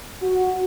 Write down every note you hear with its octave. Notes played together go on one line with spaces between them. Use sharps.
F#4